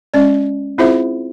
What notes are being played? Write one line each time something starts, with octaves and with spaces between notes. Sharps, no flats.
G#3 C#4 D5
C4 E4 F4 G#4 C5 E5